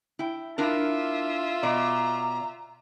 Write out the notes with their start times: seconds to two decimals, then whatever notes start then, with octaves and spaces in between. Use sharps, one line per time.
0.19 E4 G5
0.58 D4 E4 F4 A#4 E5
1.63 B2 D5 A#5